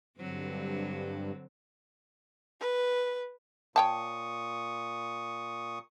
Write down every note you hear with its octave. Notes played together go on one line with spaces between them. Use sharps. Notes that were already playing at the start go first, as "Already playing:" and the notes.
G2 D3 F#3 C4
B4
A#2 C#5 G5 A5 C#6 D#6